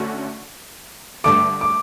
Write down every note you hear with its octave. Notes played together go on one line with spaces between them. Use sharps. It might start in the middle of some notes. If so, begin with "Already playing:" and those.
Already playing: D3 A3 C#4 F#4
G2 D3 A3 D6
D6